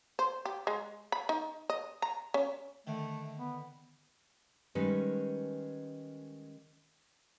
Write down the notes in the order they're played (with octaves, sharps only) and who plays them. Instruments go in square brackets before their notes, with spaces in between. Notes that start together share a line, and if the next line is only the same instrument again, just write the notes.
[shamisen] C5
G4
G#3
B5
D#4
D#5
A#5
C#4
[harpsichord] D3 D#3 [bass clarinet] A3
[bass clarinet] B3
[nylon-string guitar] D#3 G3 G#3 C#4 B4